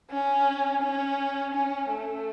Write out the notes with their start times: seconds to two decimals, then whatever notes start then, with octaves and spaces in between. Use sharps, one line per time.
0.10 C#4
0.82 C#4
1.54 C#4
1.90 A3